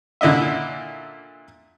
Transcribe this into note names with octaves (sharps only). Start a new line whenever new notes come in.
A#2 D3 E4 D#5 E5